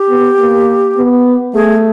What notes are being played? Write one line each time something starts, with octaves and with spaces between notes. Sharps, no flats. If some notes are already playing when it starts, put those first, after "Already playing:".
Already playing: G4
B3
A#3
B3
A3 G#4